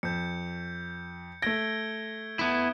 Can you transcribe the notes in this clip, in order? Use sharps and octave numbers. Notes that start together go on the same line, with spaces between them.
F2 G6 C#7
A3 G#6 A#6 D7 G7
B3 E4